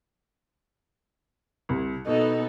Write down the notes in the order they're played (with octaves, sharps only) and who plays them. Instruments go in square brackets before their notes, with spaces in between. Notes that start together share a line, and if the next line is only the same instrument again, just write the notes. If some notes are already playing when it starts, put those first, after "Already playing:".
[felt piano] C2
[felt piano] B2 [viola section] B3 A4 [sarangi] D#4